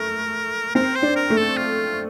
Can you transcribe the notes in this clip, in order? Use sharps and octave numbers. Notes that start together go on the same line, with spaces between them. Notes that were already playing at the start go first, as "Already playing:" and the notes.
Already playing: A3 A#4
C4 A#4
C5
D4
A#4
A3
A4
F4